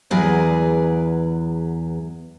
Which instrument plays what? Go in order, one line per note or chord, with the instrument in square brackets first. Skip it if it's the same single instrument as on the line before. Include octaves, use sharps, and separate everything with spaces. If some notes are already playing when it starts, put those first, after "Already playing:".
[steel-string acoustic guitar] E2 F#3 G#4 B4 D5